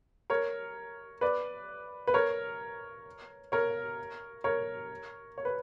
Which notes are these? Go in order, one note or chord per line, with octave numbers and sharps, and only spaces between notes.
A#4 C#5
B4 D5
B4
A#4 C#5
A#4 C#5
A#4 C#5
C#5
B4